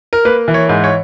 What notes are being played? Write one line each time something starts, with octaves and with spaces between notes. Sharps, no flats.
A#4
A#3 B4
E3
C#5
G#2
C#5